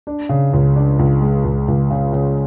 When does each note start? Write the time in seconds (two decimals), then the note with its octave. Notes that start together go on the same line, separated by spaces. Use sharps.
0.07 D4
0.29 C#3
0.53 C#2
0.76 D4
0.99 C#2
1.21 G#3
1.44 C#2
1.68 C#2
1.91 C#3
2.13 C#3